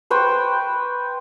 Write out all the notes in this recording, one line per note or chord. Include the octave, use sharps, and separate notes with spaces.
B4 C5 G5 C#6